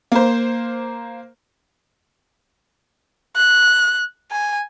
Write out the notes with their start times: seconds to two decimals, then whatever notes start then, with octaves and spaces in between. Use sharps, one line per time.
0.12 A#3 C5
3.36 F#6
4.32 G#5